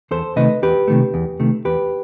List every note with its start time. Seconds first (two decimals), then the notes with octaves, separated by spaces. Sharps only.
0.11 E2 A4 C5
0.36 C3 D#3 A3 B4 D#5
0.62 E2 G4 B4
0.88 C3 D#3 A3
1.14 E2
1.40 C3 D#3 A3
1.65 E2 G4 B4